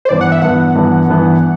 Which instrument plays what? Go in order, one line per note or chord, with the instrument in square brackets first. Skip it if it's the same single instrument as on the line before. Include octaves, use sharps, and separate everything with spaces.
[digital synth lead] C5
[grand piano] G2 E3 B3 [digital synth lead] D5
[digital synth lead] F#5
E5
[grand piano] G2 E3 B3 [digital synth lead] F#5
[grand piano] G2 E3 B3
G2 E3 B3